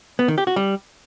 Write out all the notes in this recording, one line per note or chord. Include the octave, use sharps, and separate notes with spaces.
B3
D#3
G4
F#4
G3